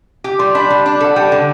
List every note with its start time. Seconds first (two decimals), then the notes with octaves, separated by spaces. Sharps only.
0.24 G4
0.39 G3 C6
0.55 D4 B5
0.70 G3
0.86 D4
1.00 A4 F#5
1.16 G3 G5
1.32 D3